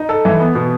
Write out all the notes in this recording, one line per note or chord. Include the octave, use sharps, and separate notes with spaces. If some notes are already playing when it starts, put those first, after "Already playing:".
Already playing: D#4
A4
E3
B3
B2